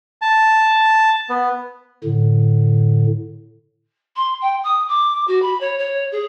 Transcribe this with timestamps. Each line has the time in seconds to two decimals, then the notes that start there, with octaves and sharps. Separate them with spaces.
0.22 A5
1.30 B3
2.04 A2 D3
4.16 C6
4.41 G5
4.64 D#6
4.88 D6
5.28 F#4
5.42 B5
5.60 C#5
5.79 C#5
6.12 G#4